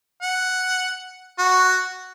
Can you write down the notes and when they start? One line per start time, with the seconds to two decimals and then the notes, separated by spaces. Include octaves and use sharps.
0.22 F#5
1.39 F#4